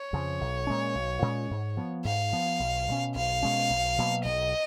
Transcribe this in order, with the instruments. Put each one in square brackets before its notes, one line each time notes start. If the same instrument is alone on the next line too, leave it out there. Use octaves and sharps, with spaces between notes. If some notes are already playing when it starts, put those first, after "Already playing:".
Already playing: [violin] C#5
[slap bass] F2 C#3 F3
B1
A#2 G#3 C#4
B1
A#2 G#3 C#4
G#2
F3 B3
[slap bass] G#2 [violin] F5
[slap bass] F3 B3
B1
B2 G#3
C#4
[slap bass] B1 [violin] F5
[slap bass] B2 G#3 C#4
B1
B2 F#3 A#3
[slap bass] B1 [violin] D#5